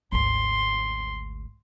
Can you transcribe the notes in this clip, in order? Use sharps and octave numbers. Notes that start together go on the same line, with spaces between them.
G#1 D2 C6